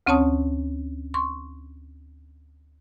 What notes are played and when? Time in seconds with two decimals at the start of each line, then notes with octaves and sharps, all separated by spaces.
0.06 D2 C4 C#4 C#5 A5 D#6
1.14 C6 C#6